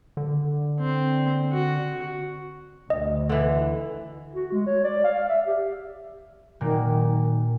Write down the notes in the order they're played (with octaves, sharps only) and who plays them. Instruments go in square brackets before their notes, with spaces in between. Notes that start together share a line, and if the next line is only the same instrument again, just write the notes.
[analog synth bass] D3
[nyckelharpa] C4
F#4
[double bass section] D2 [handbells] D#5
[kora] D3 E3
[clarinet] F#4
G#3
C#5
D5
F5
E5
G4
[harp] A#2 F#3 A#3 [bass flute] D#3